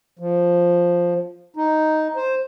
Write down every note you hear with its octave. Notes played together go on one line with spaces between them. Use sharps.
F3
D#4
C5